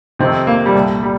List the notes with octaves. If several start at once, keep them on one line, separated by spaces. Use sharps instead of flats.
F2 C3 D#3 C4
A#3
G3
C2 A#2 A3
G3